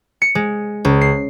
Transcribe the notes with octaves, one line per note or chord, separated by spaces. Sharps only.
C#7
G#3
C#2
C7